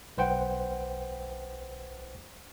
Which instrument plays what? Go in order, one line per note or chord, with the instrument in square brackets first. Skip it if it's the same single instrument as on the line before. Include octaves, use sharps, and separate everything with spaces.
[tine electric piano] B1 B4 C5 F#5 G5